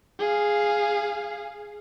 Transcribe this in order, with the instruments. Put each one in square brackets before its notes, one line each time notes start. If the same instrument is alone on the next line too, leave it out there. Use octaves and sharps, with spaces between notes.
[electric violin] G#4 F5